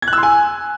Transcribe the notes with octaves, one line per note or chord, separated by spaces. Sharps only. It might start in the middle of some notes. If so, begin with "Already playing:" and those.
G#6
F#6
E6
C6
G#5